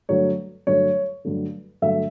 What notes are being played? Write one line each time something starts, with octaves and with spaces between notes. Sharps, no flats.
G2 D3 F#3 A3 C#5
G2 D3 F#3 A3 C#5
G2 D3 F#3 A3
G2 D3 F#3 A3 E5